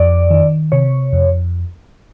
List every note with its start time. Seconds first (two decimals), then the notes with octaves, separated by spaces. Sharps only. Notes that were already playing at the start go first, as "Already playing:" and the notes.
Already playing: F2 D5
0.31 D#3
0.72 C3 C#5
1.13 F2